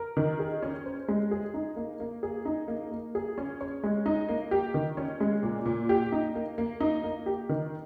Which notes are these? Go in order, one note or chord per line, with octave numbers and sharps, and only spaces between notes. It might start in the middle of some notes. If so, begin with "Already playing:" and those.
Already playing: A#4
D#3
G#4
C#4
C5
G#3
G#4
D#4
A#3
A#3
G#4
D#4
A#3
A#3
G#4
C#4
C#5
G#3
D#4
A#3
G4
D#3
C#4
G#3
A#2
A#2
G4
D#4
A#3
A#3
D#4
A#3
G4
D#3